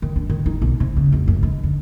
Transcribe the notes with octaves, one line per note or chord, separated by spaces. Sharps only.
D#3
D4
D#3
D#4
B1
C3
C#3
F1
F#2
D#3
D3